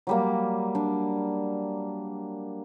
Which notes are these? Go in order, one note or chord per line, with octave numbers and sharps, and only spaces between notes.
F#3 G3 A#3
D4